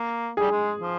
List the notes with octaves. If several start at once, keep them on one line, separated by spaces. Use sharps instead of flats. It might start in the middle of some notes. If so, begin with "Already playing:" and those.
Already playing: A#3
G3 G#4
G#3
F3